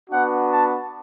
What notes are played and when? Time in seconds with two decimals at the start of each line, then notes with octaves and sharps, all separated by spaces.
0.10 B3 D4 F#4 F#5
0.51 A5